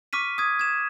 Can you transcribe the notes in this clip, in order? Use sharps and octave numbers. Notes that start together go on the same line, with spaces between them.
C#6 D6 F6 B6 D#7
D#6 G#6
G#6 E7